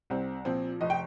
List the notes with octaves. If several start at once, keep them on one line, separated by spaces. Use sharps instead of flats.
C2 C4
A#2 F3 C4
F1 D#5
G5